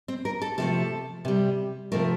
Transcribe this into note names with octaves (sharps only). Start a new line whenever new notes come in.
C4
A#4
A4
C3 F3 A3 A4
C3 G3
C3 F3 A3 A#4